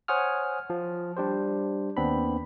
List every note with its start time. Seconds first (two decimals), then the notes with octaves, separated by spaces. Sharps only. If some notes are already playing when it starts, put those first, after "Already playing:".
0.08 C5 C#5 F#5 G#5 D#6 F6
0.70 F3
1.17 G3 D4 G4 C5
1.97 D#2 B3 C4 D4 B5